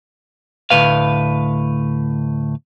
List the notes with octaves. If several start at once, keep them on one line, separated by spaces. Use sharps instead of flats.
D2 A2 B4 F5